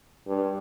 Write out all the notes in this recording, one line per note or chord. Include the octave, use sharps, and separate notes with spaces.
G2